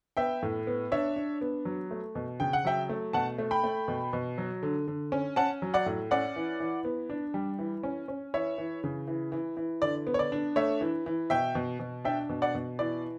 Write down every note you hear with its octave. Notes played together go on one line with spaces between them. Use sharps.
B3 E5 G5
A2
B3
D4 C#5 E5
D4
B3
F#3
A3
B2
C#3 G5
F#5
F#3 E5 G5
A3
B2 F#5 A5
A3
G5 B5
A3
B2
B2
F#3
D3
D3
C#4
C#4 F#5 A5
F#3
D5 F#5
A2
C#4 D5 F#5
E3
E3
B3
D4
G3
E3
C#4
C#4
E3 C#5 E5
E3
C#3
E3
E3
E3
D3 D5
B3
C#5
D5
D4
A3 C#5 E5
E3
E3
B2 E5 G5
B2
B2
D4 E5 G5
B2
D5 F#5
B2
E3 D5